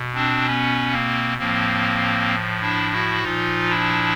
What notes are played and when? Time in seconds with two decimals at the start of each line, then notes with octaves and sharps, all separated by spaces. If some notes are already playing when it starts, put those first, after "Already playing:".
Already playing: B2
0.14 C4 D4
0.45 B3 C#4
0.91 A#3 C4
1.38 A2 F3 A#3 C4
2.61 D4 E4
2.92 E4 F#4
3.22 A#2 F3 D#4 F4
3.69 D4 E4